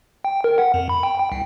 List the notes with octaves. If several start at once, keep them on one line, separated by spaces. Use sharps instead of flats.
G5
A#4
F#5
F2
B5
G5
G5
C2